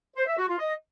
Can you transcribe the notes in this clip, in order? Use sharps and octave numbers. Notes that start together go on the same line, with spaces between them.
C5
E5
F#4
F4
D#5